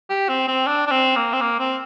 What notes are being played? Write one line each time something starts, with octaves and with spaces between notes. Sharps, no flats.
G4
C4
C4
D4
D4
C4
A#3
C4
A#3
C4